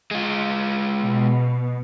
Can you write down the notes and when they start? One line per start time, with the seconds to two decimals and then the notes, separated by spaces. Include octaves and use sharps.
0.11 G#3 F4
1.01 B2